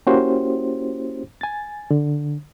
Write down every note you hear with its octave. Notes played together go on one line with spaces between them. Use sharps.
A#3 C#4 E4 F#4 G4 C5
G#5 A6
D3